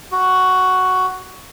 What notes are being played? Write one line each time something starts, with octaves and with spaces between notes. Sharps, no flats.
F#4